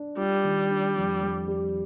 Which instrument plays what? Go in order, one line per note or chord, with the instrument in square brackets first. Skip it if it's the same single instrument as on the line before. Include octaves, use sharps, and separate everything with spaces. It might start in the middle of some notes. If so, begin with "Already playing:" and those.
Already playing: [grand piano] D4
[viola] G3 [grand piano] F4
[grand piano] D#3
D4
F2
F2
G3